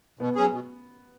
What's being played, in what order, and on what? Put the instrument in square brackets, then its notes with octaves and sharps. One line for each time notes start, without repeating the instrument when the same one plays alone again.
[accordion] B2 [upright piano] B3
[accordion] F#3 C#4 G#4
B2